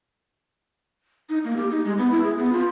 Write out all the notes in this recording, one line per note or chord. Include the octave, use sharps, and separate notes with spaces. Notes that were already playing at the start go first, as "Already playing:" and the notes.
D#4
A#3
G4
D#4
G#3
B3
E4
G#4
B3
F4